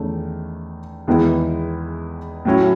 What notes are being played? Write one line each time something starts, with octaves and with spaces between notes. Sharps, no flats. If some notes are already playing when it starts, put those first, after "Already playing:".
Already playing: E2 D#3 A3 C#4
E2 D#3 G#3 B3 E4
A2 F#3 C#4 E4